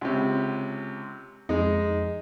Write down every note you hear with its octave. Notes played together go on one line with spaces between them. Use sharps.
C#2 C3
F2 G#3 D#4